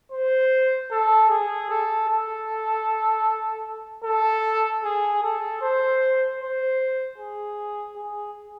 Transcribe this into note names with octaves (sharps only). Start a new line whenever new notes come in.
C5
A4
G#4
A4
A4
A4
G#4
A4
C5
C5
G#4
G#4